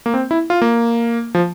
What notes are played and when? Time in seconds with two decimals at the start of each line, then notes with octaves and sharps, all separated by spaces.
0.06 A#3
0.14 C4
0.31 E4
0.50 F4
0.62 A#3
1.35 F3